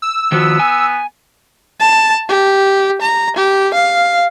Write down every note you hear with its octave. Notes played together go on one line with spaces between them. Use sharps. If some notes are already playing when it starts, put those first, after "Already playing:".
E6
D#3 F3 B3 F#4
G#5
A5
G4
A#5
G4
F5